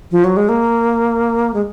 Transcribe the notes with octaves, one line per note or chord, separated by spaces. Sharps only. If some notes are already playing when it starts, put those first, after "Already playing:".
F3
F#3
G#3
A#3
G#3